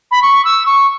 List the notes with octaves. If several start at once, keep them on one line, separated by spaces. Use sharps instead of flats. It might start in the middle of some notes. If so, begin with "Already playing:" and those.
B5
C#6
E6
C#6